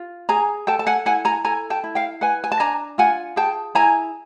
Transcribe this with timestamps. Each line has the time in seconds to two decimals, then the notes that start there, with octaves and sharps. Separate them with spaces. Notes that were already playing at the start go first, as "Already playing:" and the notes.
Already playing: F4
0.29 G#4 G#5 A#5
0.67 A4 G5 A5
0.79 A5
0.87 F#5 G#5
1.06 E4 F#5 G#5
1.25 G#5 A#5
1.45 A4 G#5 A#5
1.70 G5 A5
1.84 E4
1.95 F5 G5
2.21 B4 F#5 G#5
2.44 G#5
2.52 A5
2.60 D4 G#5 A#5
2.98 F4 F#5 G#5
3.36 G#4 G5 A5
3.75 E4 G#5 A#5